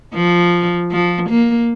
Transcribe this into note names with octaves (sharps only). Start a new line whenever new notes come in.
F3
F3
A#3